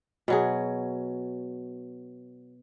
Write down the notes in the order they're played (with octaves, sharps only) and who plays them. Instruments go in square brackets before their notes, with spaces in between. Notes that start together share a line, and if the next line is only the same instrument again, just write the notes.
[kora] B2 F#3 G#4